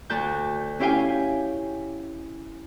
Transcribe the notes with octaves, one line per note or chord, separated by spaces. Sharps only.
D2 A5 F#6 G6
C#4 E4 G4 F5 G5 G#5